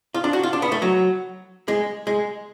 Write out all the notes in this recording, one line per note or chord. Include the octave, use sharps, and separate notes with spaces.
F4
D4
F#4
F4
D4
B3
A3
F#3
G#3
G#3